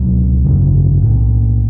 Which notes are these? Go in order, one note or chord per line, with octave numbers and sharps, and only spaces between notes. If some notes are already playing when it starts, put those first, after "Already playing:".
Already playing: C#2 B2 F#3
G#1 F#2 C#3
B1 A2